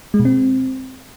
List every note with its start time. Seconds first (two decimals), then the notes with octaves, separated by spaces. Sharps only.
0.14 G#3
0.20 B2
0.25 C4